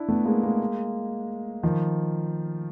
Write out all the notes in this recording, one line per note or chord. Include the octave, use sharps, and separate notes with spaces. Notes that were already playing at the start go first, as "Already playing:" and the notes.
Already playing: D4 E4
A3 B3
G#3 A#3
G#3 A#3
D#3 F3